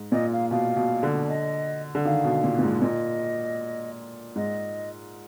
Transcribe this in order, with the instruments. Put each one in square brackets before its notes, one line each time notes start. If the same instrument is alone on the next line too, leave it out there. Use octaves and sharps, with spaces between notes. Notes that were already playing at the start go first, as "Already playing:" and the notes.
Already playing: [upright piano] G#2
[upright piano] A#2 [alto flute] D#5
[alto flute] F5
[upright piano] B2 [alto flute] F5
[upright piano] B2
D3
[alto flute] D#5
[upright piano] D3
[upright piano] D#3 [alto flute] F5
[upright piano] B2
A#2
A#2
G#2
[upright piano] A#2 [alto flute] D#5
[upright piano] G#2 [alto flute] D#5